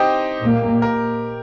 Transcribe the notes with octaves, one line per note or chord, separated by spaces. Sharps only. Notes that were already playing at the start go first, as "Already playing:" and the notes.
Already playing: C4 D#4 G4 C5 D#5 G5
A#2 A#3
A#4